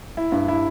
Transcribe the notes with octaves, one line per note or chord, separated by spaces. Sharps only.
E4
G2
E4